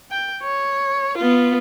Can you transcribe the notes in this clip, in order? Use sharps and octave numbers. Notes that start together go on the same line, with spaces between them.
G5
C#5
B3 F4